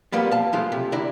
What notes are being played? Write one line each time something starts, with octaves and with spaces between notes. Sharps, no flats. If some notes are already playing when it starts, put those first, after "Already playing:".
F2 F3 G3 A#3 B3
F5 A5
F3 G#3 A3 F4
C3
D3 D4 E4 A#5